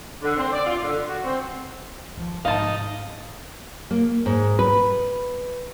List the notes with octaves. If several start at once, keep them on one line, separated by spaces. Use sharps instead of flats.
D3
C4
D5
F4
D3
F#4
C4
F3
G#1 C3 D#4 F5 A5
A#3
G#2
B4